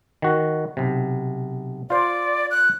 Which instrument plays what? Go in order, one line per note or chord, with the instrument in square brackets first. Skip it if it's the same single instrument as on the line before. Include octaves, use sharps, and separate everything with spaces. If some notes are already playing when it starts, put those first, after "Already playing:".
[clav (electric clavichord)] D#3 F#4
B1 C3
[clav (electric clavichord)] F4 C5 [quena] D5
[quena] F#6